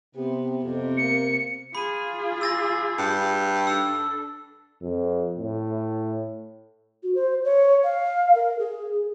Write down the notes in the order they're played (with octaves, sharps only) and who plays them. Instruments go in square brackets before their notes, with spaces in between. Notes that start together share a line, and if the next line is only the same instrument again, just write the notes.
[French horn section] C3 C4 G4 [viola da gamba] B3
[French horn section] F2 [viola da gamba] C3
[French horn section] A#3 [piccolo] C#7
[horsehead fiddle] F4 G#4 [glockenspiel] B5 D#7
[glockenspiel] E6 A6 A#6
[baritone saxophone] G2
[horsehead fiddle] D4 A4 [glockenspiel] E6
[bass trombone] F2
A2
[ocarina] F#4
C5
C#5
F5
A#4
G#4